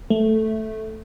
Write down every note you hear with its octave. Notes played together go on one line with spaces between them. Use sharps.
A3